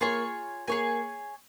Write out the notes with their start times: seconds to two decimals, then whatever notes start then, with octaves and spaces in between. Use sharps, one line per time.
0.01 A#3 F4 G#4 C#5 G#5
0.68 A#3 G#4 C#5 G#5